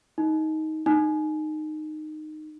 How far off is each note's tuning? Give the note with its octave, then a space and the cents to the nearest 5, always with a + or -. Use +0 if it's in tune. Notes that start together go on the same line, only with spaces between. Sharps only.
D#4 +15
D#4 -15